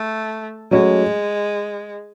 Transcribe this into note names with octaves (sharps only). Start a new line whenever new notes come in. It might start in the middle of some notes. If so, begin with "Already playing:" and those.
Already playing: A3
F#3 G#3 A3 C#4 F#4